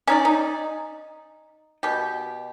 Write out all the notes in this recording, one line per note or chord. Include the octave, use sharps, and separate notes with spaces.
C#4 D#4 D5
D#4
B2 G4